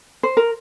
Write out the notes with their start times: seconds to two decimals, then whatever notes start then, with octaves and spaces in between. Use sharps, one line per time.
0.23 C5
0.37 A#4